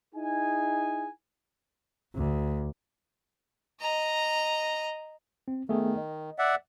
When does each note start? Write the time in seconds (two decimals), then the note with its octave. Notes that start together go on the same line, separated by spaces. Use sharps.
0.15 D#4 E4 G#4 G#5
2.14 D2
3.81 D#5 A#5
5.48 C4
5.69 D#3 A3 B3 G#4
5.98 D#5
6.38 D5 E5 F#5